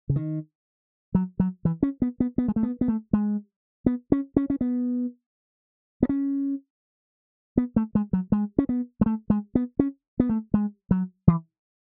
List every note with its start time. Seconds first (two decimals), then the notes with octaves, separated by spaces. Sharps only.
0.09 C#3
0.16 D#3
1.15 F#3
1.40 F#3
1.65 E3
1.83 C#4
2.02 B3
2.20 B3
2.38 B3
2.48 G#3
2.56 A3
2.63 B3
2.81 B3
2.88 A3
3.13 G#3
3.86 B3
4.12 C#4
4.36 C#4
4.50 C#4
4.61 B3
6.03 B3
6.09 C#4
7.57 B3
7.76 A3
7.95 G#3
8.13 F#3
8.32 G#3
8.58 C#4
8.69 B3
9.01 G#3
9.06 A3
9.30 G#3
9.55 B3
9.79 C#4
10.20 B3
10.29 A3
10.54 G#3
10.91 F#3
11.27 E3